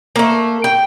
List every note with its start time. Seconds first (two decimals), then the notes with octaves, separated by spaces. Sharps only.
0.16 A3 A#3
0.64 G5